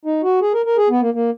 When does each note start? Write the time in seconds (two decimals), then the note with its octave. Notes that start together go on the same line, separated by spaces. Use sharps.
0.05 D#4
0.23 F#4
0.42 G#4
0.54 A#4
0.66 A#4
0.78 G#4
0.90 B3
1.02 A#3
1.14 A#3